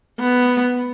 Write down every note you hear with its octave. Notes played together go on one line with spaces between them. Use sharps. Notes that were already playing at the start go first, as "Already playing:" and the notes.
B3